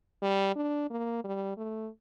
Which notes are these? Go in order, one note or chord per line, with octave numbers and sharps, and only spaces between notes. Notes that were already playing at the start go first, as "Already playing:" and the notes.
G3
D4
A#3
G3
A3